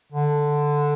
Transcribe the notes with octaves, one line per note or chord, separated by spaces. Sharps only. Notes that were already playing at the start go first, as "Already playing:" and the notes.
D3